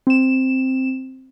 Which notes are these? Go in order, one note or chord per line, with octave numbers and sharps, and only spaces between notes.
C4 E7